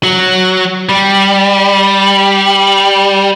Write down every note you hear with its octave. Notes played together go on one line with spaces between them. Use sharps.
F#3
G3